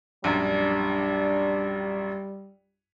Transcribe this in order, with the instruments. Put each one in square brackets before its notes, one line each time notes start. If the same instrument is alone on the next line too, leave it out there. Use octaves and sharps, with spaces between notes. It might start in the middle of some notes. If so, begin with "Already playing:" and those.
[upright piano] A#1 F#2 [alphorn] G3 [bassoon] D4